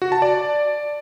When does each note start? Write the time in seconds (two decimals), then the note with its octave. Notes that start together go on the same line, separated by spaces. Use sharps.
0.02 F#4
0.12 A5
0.22 D5